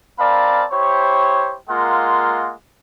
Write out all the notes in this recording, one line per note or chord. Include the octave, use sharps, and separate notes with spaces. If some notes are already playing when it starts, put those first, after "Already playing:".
C4 A#4 D5 F5 A5 B5
E4 G4 C5 C#5
G#3 A#3 F4 A#4 F#5 C6